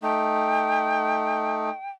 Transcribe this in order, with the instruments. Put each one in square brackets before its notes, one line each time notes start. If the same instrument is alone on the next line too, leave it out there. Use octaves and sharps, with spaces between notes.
[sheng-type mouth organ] A3 D#4 [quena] G5